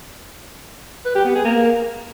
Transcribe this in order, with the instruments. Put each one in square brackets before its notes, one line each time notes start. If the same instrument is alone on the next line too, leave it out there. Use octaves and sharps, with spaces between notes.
[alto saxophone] B4
G4
B3
G#4
A#3